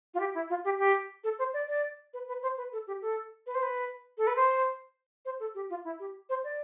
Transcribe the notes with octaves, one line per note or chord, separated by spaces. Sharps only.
F4
G4
E4
F4
G4
G4
A4
C5
D5
D5
B4
B4
C5
B4
A4
G4
A4
B4
C5
B4
A4
B4
C5
C5
A4
G4
F4
E4
G4
C5
D5